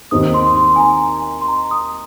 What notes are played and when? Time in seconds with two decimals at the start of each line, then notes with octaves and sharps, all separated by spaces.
0.11 D#2 D#3 C4 D#4 A#4 D#6
0.34 C6
0.57 C6
0.76 G#5
0.80 A#5
1.42 C6
1.48 A#5
1.71 D#6